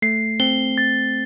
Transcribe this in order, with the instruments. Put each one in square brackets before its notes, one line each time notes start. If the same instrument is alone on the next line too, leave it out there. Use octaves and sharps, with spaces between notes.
[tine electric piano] A3 [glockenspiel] C7
[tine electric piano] C4 [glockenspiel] G7
[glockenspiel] A6